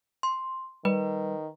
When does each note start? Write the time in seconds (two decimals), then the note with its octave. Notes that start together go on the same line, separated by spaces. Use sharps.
0.23 C6
0.85 D#3 G3 B4